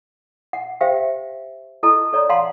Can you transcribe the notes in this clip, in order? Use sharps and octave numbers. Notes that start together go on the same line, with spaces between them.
F#5
G4 C5 E5 F5 G5
E4 A4 D#5 A5 A#5
A4 C#5 D5 A#5
F5 F#5 A5 A#5 C6